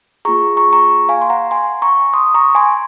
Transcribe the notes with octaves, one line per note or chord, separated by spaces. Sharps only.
A#3 F4 G#4 A#5 C#6
A#5 C#6
A#5 C#6
F5 G#5
C6
F#5 A#5
G#5 C6
A#5 C#6
C6 D#6
A#5 C#6
G#5 C6